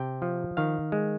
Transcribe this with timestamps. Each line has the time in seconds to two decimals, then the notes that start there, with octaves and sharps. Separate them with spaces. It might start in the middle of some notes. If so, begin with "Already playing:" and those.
Already playing: C3 G5
0.22 F3
0.57 D#3 F5
0.92 G#3